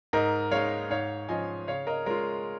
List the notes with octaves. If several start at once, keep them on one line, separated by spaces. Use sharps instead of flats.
G#2 A#4 D#5
G#3 D#4 C#5 F5
G#2 C#5 F5
F3 C#4 F4 D#5 G#5
C#3 C#5 F5
A#4 D#5
G#3 C#4 F4 A#4